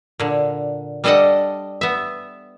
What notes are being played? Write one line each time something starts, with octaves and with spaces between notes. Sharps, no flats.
A#2 D3
G3 D4 A4 D5 D#5 F#5
B3 E5